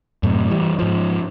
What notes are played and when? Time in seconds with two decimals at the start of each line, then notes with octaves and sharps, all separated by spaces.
0.23 F#2 A2 C3
0.50 E3 G3
0.79 G#2 F3